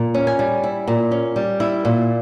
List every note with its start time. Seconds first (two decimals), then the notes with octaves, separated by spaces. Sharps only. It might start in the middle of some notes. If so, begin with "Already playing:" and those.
Already playing: A#2
0.14 C#4
0.27 G#5
0.39 G3
0.64 E4
0.88 A#2
1.11 C#4
1.36 G3
1.60 E4
1.85 A#2